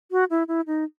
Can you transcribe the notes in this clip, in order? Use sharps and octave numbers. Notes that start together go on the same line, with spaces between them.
F#4
E4
E4
D#4